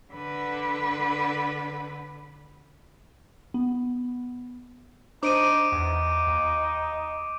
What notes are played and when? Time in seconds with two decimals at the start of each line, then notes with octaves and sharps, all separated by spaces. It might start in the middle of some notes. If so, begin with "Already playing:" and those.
0.13 D3 B4
3.54 B3
5.23 D4 D#4 C5 D6 D7 D#7
5.72 E2 D#4
6.27 D#2